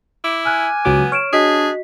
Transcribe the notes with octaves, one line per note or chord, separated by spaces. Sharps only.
E4 D6
G#5 F6 F#6
C#2 F#3 B3 D6
C#5 F6 D7 E7
D4 F#4 G#4 D#5 B6